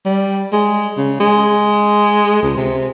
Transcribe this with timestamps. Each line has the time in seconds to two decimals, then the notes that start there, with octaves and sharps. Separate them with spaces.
0.06 G3
0.53 G#3
0.97 C#3
1.20 G#3
2.43 C#2
2.57 C3